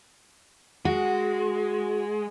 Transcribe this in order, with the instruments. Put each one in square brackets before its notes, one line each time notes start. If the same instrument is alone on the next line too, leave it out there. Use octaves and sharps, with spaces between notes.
[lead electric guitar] G#3 [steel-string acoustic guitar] F#4